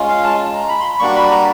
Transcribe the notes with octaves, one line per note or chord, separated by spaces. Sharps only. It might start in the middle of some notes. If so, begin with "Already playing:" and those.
Already playing: G#3 C#4 F4
F5
A5
A5
A#5
B5
C6
B5
G3 A#3 D4 F#4 C#6
B5
A#5